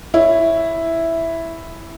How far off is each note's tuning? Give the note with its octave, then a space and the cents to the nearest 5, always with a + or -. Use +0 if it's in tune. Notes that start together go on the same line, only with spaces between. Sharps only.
E4 +0 C#5 +5